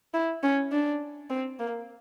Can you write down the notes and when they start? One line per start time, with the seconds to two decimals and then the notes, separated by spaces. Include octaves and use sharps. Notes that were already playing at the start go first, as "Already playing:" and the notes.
0.14 E4
0.43 C#4
0.72 D4
1.30 C4
1.59 A#3